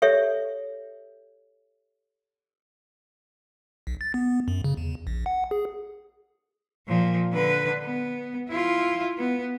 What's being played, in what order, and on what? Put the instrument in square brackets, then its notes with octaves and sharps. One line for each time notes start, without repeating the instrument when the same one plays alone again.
[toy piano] G4 A4 C#5 E5
[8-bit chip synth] B1
A6
B3
F#2
C#3
E2
A#1
F#5
G#4
[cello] A#2 F3
D3 B4
B3
E4 F4
B3